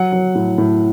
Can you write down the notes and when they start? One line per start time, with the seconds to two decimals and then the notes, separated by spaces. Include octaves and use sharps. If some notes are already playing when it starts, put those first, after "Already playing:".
Already playing: F#3 F#5
0.12 F#3
0.35 A2
0.58 A2